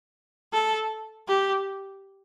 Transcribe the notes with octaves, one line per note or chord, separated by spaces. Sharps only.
A4
G4